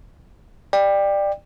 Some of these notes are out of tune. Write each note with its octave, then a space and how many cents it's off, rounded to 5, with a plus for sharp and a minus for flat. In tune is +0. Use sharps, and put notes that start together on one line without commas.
D5 +20 G5 +15